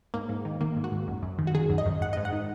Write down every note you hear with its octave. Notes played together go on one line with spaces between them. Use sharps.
G#2 A#3
G#2
D#3
D#3 A#3
G#2
F#4
G#2
F#2
F#2
D#3
F#4
D#3 G#4
F#2
D#5
F#2
G#2 F#5
D#5
G#2
F#5
D#3